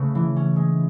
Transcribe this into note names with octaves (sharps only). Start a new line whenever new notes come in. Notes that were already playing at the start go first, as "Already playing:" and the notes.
Already playing: C#3 A3 C#4 B4
E3
C#4
G#3